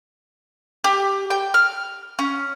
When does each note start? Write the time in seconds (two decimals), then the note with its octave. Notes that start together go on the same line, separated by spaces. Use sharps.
0.84 G4
1.30 G5
1.54 F6
2.19 C#4